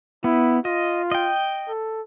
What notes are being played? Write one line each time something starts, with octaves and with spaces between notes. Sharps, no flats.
B3 E4
F4 D#5
D#5 G5
A4